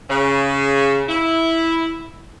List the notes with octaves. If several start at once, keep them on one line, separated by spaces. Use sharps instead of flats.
C#3
E4